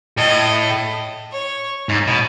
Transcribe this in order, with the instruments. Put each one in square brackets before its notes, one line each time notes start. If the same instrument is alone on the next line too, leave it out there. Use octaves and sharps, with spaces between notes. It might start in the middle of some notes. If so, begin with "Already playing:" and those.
[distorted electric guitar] A2 [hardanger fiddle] D#5
[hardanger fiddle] C#5
[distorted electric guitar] G#2
B2